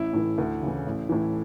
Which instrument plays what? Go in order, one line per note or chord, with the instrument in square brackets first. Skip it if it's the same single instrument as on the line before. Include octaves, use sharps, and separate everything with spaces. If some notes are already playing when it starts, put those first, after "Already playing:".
Already playing: [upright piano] A1 E4
A2 E3
D2
C#3 E3
A1
A2 E3